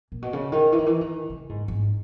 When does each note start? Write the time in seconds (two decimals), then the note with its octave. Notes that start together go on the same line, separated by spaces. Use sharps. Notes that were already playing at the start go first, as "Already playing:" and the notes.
0.12 A#2
0.22 B2
0.33 C#3
0.52 D#3
0.72 E3
0.79 D#3
0.86 E3
1.01 D#3
1.30 C#3
1.49 G#2
1.68 G#2